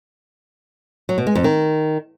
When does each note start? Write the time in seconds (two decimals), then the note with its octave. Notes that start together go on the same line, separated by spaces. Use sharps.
1.09 F#3
1.18 B2
1.27 G#3
1.35 F2
1.44 D#3